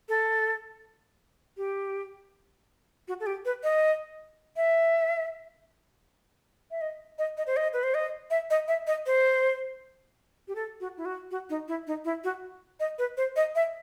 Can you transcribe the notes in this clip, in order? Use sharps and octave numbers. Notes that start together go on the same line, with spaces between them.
A4
G4
F#4
A4
G4
B4
D#5
E5
E5
D#5
D#5
D#5
C5
D#5
B4
C5
D#5
E5
D#5
E5
D#5
C5
G4
A4
F#4
E4
F#4
F#4
D#4
E4
D#4
E4
F#4
D#5
B4
C5
D#5
E5